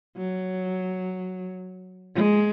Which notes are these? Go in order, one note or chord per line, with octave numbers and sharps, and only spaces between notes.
F#3
G#3